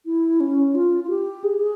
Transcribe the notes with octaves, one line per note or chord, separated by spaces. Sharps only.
E4
C#4
F4
F4
G4
G#4